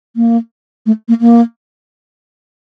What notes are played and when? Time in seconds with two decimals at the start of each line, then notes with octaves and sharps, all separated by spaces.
0.16 A#3
0.86 A3
1.08 A#3
1.20 A#3